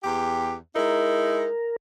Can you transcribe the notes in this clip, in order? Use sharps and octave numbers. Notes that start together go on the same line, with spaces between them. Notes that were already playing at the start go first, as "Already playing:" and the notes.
E2 G4
G#3 D#4 E4 A#4